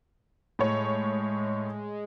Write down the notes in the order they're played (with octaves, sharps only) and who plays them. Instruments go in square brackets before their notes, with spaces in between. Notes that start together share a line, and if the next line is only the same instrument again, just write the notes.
[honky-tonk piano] A2 C#5 [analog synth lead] G#3